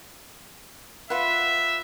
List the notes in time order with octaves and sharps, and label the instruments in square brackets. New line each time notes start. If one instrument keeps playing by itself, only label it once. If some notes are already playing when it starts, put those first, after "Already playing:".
[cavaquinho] F4 B4 F#5 [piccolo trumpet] E5